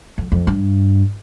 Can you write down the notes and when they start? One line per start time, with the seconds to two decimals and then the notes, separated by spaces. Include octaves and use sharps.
0.18 F2
0.32 F2
0.47 G2